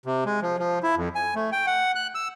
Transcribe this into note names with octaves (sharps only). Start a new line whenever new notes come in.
C3
G#3
F3
F3
E4
F2
G#5
A3
G5
F#5
F#6
E6